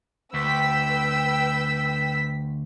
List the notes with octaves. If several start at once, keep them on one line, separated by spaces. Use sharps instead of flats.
D2 B4 G5 E6 B6